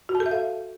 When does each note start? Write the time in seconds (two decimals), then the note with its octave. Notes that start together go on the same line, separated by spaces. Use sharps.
0.09 F#4
0.15 A5
0.20 A4
0.26 E5
0.31 F5